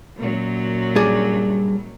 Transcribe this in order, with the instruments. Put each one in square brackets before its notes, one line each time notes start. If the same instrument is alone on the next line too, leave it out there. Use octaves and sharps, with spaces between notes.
[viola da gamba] F#2 A#2 F#3
[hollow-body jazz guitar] G2 G#4 D5